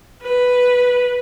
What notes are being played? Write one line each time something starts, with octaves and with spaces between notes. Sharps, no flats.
B4